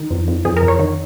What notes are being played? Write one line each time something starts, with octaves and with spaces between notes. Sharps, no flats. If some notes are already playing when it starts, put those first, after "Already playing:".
Already playing: D#3 D#4
F2
F2
F2 G#4
A#4
F2
C#5
D#3